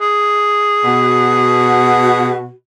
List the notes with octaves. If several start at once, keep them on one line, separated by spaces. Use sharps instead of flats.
G#4
B2 F#4